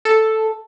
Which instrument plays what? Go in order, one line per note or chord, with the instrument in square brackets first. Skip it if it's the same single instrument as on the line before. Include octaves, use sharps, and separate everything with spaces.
[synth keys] A4